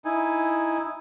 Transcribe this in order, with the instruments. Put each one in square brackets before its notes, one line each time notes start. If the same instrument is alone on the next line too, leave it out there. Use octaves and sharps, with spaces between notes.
[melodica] D#4 E4 G#5